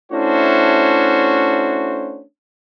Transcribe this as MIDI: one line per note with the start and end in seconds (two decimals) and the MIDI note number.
0.13 2.22 57
0.13 2.22 61
0.13 2.22 62
0.13 2.22 64
0.13 2.22 66
0.13 2.22 72